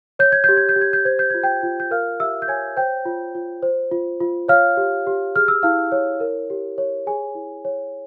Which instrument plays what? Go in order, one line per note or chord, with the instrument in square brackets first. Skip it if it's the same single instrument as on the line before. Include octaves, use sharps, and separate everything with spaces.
[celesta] C#5 G6
G#6
G4 G6
G#6
G6
G4
G#6
G6
C5 G#6
G6
F4 G#6
G5 G6
F4
G6
A#4 F5 F6
G4 E5 E6
G6
C#5 G#5 G#6
C5 G5 G6
F4
F4
C5
F4
F4
C#5 F5 F6
G4
G4
G#4 F6
E6
E4 F5 F6
C#5
A#4
G4
C#5
G#4 G#5
E4
C#5